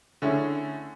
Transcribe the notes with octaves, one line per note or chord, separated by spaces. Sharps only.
D3 A3 C#4 E4 G#4